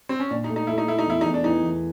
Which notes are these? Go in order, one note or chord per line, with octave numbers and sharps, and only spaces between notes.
C4
C#4
A#2 D4
D#4
A3
D#4
A3 E4
D#4
A3 E4
D#4
E2 E4
D#4
E2
D4
E3 D#4
E2